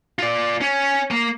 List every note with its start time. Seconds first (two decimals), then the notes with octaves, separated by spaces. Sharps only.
0.19 F4 D5
0.61 C#4
1.11 A#3